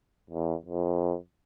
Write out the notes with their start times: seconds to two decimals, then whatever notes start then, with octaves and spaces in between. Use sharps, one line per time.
0.30 E2
0.66 F2